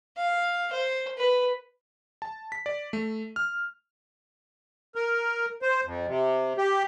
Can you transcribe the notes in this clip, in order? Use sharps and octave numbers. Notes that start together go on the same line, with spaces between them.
F5
C5
B4
A5
B6
D5
A3
F6
A#4
C5
F2
C3
G4